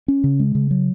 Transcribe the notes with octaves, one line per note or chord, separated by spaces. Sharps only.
C#4
C#3
G#3
C#3
F#3